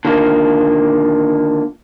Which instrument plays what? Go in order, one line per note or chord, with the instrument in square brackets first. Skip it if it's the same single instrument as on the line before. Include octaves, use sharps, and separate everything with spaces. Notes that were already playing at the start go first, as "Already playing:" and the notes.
[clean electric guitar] D3 D#3 A#3 F4